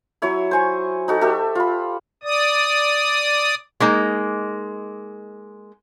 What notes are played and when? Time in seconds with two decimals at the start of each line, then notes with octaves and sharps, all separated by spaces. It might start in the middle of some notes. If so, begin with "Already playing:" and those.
0.22 F#3 E4 C#5 E5
0.51 C5 G#5 C#6
1.08 D#4 F#4 A4
1.21 G4 A4 E5
1.55 F4 B5
2.23 D5 D#6
3.80 G#3 A#3 D#4